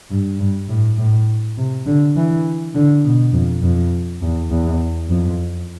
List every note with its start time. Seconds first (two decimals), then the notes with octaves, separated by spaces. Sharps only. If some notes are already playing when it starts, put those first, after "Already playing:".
0.11 G2
0.40 G2
0.68 A2
0.98 A2
1.58 C3
1.86 D3
2.16 E3
2.75 D3
3.05 B2
3.33 F2
3.63 F2
4.22 E2
4.50 E2
5.09 F2